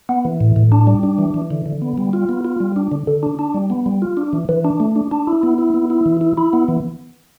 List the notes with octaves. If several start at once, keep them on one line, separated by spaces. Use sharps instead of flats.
B3
E3
A2
A2
D4
G3
D4
E3
E3
D3
D3
B3
G3
F4
B3
F4
G3
D4
D3
D3
D4
D4
G3
B3
G3
F4
D4
E3
E3
D4
A3
D4
D4
E4
B3
E4
B3
E4
E3
E4
E4
B3
E3